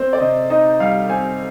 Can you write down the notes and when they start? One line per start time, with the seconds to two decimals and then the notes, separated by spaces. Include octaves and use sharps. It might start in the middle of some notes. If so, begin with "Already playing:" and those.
Already playing: C4 C5
0.13 D5
0.20 C3 D#5
0.50 D#4 D#5
0.80 G3 F5
1.09 C4 G#5